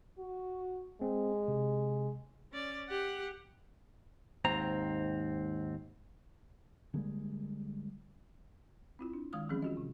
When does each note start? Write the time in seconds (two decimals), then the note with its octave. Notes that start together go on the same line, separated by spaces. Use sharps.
0.18 F#4
1.02 G#3 C4
1.48 C3
2.52 C#4 D5
2.89 G4 F#5
4.45 D#2 G#2 C4 A#5
6.94 D3 G3 G#3 A#3
8.99 C4 E4 F4
9.14 D4
9.33 D#3 G#3 F5 D#6 F6
9.49 E3 F3 G3 C4 C#4 G#4
9.62 F4 F#4 D#5
9.77 C3